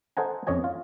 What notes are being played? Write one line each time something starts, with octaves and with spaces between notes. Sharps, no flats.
A4 C5 D#5 F#5 G#5 A#5
F2 C#4 C#5 D#5 G#5
F4